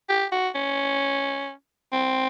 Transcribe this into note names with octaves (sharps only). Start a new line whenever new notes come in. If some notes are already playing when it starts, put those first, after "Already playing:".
G4
F#4
C#4
C4